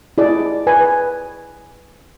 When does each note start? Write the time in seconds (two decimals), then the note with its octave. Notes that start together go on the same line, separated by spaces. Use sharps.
0.18 E4 G#4 D5
0.67 B4 G#5